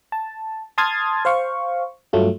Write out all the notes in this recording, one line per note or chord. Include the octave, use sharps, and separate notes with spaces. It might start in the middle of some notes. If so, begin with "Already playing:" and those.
A5
A5 C6 D#6 F6 G#6 A6
C5 F5 C#6
G2 F#3 A3 F4